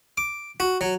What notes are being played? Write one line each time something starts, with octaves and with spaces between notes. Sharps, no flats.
D6
F#4
F#3